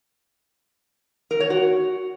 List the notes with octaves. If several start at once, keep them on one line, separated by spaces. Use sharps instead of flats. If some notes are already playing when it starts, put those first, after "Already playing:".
A#4
C#5
F#4